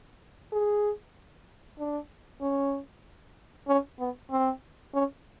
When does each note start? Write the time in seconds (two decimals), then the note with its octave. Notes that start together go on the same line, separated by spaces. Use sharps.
0.53 G#4
1.79 D4
2.42 C#4
3.68 C#4
3.99 B3
4.31 C4
4.94 C#4